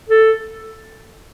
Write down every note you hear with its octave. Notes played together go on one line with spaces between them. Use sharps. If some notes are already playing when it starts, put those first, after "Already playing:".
A4